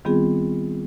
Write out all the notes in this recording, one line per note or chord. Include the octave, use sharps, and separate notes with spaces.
D#3 G3 B3 C4 F4 G#4